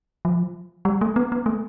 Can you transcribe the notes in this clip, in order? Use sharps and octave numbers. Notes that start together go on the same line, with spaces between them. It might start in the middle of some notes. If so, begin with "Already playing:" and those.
F3
G3
A3
B3
B3
A3